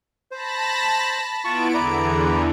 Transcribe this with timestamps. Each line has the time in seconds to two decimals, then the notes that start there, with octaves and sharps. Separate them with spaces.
0.31 C5 A5 B5 A#6
1.44 B3 E4 F4 A5 C#6 D7
1.74 E2 D3 E3 E4 D5 A#5